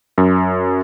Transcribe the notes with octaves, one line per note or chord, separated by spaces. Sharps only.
F#2